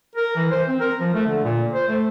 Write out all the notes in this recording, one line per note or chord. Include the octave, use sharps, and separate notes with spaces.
A#4
E3
C5
C4
A#4
F3
A3
D3
A#2
C5
A3